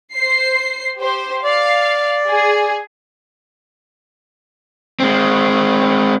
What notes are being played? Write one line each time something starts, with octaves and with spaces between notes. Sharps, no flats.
C5 C7
G4 C5
D5 F5
G#4
G#3 C4